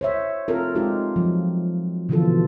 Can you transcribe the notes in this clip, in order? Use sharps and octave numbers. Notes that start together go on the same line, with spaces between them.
C5 C#5 E5
C4 F4 A4 A#4
G#3 C4 D#4 F4 G4
F3 F#3
B2 D3 E3 F3 F4 A4